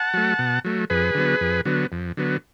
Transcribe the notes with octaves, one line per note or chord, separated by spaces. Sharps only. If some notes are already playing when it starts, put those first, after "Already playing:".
Already playing: F#5 A5
F#3 A3
B2
F#3 A3
F2 G#4 B4
D3 F#3 B3
F2
D3 F#3 B3
F2
D3 F#3 B3